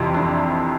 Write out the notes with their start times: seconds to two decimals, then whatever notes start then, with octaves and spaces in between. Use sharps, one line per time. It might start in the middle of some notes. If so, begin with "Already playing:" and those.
Already playing: F2 C3 E3 E4
0.14 D4